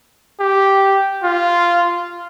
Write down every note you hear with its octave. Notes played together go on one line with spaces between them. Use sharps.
G4
F4